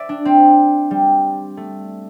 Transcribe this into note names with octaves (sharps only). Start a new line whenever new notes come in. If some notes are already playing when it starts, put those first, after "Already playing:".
Already playing: D5 E5
D4
C4
G3
A3